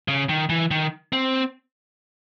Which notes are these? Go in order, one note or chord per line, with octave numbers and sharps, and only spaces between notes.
C#3
D#3
E3
D#3
C4